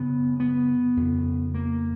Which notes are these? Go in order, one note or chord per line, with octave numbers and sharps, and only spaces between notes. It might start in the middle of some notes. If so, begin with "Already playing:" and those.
Already playing: F#2 C#3 B3
B3
F2 C#3
A#3